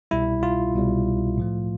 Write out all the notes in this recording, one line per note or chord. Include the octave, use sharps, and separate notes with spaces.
C2 B2 G3 E4
F4
C2 B2 G3
A2 F3 A3